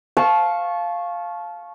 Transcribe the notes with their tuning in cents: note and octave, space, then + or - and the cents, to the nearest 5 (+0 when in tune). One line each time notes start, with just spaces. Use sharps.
F5 +0 A5 -25 C#6 -15